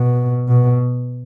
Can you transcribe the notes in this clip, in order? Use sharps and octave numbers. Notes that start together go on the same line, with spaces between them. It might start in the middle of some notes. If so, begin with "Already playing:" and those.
Already playing: B2
B2